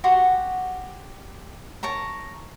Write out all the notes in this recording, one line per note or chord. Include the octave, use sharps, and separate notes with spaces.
F#4 G4 F#5 C6
A#4 C#5 A5 A#5